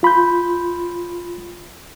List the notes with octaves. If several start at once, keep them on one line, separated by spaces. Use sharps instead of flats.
F4 B5 C6 G6